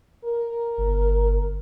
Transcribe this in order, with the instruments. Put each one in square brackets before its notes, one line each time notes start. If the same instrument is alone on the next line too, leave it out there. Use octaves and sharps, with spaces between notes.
[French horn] A#4
[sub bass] G1